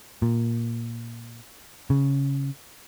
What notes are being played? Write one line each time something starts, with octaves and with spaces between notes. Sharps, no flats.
A#2
C#3